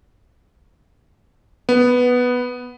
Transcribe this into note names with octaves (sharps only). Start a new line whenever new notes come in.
B3